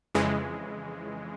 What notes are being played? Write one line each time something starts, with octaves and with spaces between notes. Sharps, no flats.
F2 C#3 E3 G#3